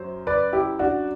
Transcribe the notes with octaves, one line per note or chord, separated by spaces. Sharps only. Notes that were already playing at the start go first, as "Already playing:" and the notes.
Already playing: F#2 F#3 C5
B4 D5
E4 G4
D4 F#4